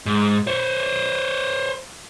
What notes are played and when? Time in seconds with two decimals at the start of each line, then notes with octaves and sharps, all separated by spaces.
0.06 G#2
0.47 C5 C#5